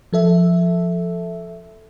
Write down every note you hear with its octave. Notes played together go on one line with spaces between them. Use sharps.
F3 A4 E5